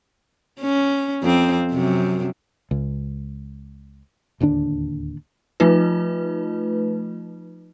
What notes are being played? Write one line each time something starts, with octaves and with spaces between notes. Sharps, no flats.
C#4
F2 C4
F#2 C3
C#2
D1 D#2 D3 D4
F3 A3 D#4 F4 B4